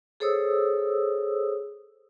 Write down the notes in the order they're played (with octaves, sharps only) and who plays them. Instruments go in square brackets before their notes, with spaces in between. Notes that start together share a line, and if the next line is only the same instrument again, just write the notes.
[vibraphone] G#4 A4 C5 C#5 D#6 E6